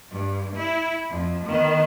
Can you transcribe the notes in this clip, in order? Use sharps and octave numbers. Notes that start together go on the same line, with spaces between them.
G2
E4
F2
D#3 B3